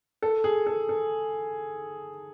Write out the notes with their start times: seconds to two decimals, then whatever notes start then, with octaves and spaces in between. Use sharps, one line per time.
0.22 A4
0.44 G#4
0.67 A4
0.89 A4